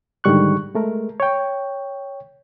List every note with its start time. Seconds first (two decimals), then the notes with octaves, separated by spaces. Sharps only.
0.24 G#2 D3 D#3 G3 C#6 F#6
0.75 G#3 A3 A#4
1.20 C#5 G5